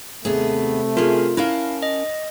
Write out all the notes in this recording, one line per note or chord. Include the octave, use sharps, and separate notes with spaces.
D#2 C3 A3 B3 G#4
C#4 F4 G#4 A#4
C#4 E4 A#4 F5 A5
D#5